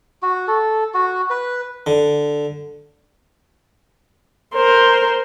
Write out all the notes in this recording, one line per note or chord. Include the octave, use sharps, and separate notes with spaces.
F#4
A4
F#4
B4
D3
A#4 C5